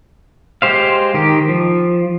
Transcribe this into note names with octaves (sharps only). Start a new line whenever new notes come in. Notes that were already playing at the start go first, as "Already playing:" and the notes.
G#3 G4 C5 F5
D#3 G4
F3